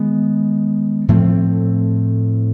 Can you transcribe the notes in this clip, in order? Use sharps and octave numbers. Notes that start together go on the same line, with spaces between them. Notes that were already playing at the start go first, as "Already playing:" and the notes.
Already playing: D#3 G#3 B3
A2 F3 A3 C4